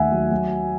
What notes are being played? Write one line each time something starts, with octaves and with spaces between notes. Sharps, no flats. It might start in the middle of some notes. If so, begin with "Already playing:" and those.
Already playing: D#2 D#3 A3 E5 F#5 G#5
F#3
F#3